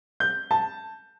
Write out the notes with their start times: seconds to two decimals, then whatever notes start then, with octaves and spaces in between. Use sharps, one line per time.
0.20 G6
0.51 A5